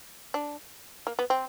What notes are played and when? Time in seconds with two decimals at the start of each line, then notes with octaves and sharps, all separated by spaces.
0.34 D4
1.07 A#3
1.19 B3
1.30 C4